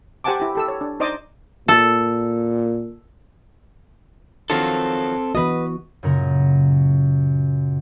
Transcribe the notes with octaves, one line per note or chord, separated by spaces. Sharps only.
G4 C5 F#5 G#5 A5 D6
E4 G4
G4 A4 E6
C#5
D4
D#4 C5 D5 D#5 D6 D#6
A#2 A4
D#3 F3 F#3 C4 A4
E3 B3 F#4 B4 D#5
F#2 A#2 C#3 A#4